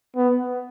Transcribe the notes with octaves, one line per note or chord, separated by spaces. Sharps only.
B3